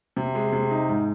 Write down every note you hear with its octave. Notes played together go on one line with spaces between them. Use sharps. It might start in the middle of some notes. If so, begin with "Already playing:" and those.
C3
G#3
C3
D#4
G#2